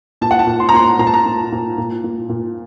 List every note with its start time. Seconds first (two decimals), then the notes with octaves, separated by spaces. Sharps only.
0.21 A#2 A5
0.31 F#5
0.39 A5
0.47 A#2
0.60 C6
0.69 A#5
0.73 A#2 C6
0.99 A#2 A#5
1.07 A5
1.14 A#5
1.26 A#2
1.52 A#2
1.78 A#2
2.04 A#2
2.29 A#2